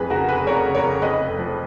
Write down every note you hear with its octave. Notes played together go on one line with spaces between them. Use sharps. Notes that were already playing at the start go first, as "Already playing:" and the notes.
Already playing: F2 G#4 B4
C#3 F#4 A#4
F1 G#4 B4
F2 A#4 C#5
C#3
A#4 C#5
C#3
F2 B4 D#5
F1
F3